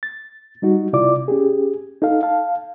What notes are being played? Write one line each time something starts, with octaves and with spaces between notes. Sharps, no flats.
A6
G3 D#4 F#4
C3 E4 F4 D5 D6
C#4 G4 G#4
D#4 A4 F5
F5 A5